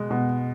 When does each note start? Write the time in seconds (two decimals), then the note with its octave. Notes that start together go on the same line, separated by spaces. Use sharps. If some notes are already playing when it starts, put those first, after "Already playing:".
Already playing: B2 G#3
0.10 B2